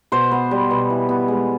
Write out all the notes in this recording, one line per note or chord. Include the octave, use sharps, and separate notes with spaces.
B2 C5
B3
G3
B2
E3
B3
G#3